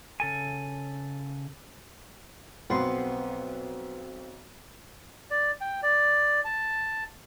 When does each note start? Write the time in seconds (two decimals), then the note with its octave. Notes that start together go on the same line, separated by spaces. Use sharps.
0.20 C#3 A4 G#5
2.70 B1 F2 B3 B4 C6
5.31 D5
5.61 G5
5.83 D5
6.45 A5